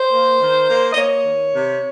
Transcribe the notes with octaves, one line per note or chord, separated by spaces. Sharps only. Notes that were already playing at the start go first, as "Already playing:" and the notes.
Already playing: C5
A#3
D#3
A#3
D#5
A#3 C#5
D#3
C3